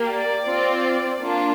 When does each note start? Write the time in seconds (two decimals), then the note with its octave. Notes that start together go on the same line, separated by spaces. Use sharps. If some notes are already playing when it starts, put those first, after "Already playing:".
Already playing: A#3 G4
0.09 D5
0.47 C4 F4
1.21 A#3 D4 F4